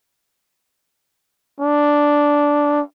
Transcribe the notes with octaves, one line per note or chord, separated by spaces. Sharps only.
D4